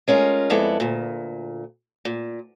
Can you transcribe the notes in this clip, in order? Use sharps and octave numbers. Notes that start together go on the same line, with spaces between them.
G#3 C#4 F4 A#4
F2 G#3 B3 E4 A4 D5
D2 A#2
A#2